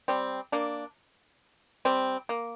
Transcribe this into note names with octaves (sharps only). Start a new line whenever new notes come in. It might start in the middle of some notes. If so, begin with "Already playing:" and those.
G3 C4
A#3 D4
G3 C4
A#3